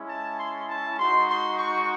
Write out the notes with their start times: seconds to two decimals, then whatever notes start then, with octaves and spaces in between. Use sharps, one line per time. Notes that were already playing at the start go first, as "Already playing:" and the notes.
Already playing: G#3 C#4 E4
0.08 A5
0.38 C6
0.68 A5
0.98 G#3 D#4 F#4 C6
1.27 C6
1.58 C#6